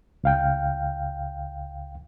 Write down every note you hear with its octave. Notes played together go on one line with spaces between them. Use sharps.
C#2 F5 G5